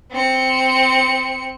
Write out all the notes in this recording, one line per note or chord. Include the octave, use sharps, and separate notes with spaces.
C4 C#7